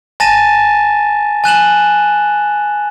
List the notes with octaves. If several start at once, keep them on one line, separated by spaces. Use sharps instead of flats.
G#5 A5 A6 A#6 D#7 E7
G#5 F#6 E7 F#7